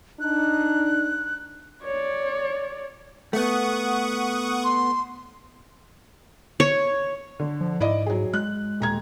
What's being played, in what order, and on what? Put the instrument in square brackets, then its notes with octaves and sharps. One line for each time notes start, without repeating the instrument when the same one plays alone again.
[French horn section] D4 D#4 [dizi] F#6
[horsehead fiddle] C#5 D5
[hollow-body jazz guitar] A3 B3 [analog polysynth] F#5 C#6 D#6
[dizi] C6
[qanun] C#5
[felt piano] D3
[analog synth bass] F3
[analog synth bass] G#2 [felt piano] E4 D5 D#5
[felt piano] F#3 G#4
[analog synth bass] G#3 [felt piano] F#6
[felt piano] D#1 A#5 G#6